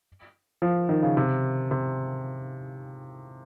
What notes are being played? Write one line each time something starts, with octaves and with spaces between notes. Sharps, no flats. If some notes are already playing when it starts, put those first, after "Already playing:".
F3
D#3
C#3
C3
C3